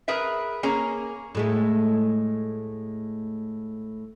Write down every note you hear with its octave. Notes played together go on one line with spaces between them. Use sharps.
G#4 A#4 B4 E5
A#3 C#4 G#4 A#5
A2 G#3 A3